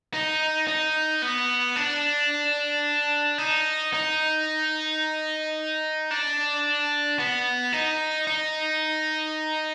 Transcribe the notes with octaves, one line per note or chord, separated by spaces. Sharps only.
D#4
D#4
B3
D4
D#4
D#4
D4
B3
D#4
D#4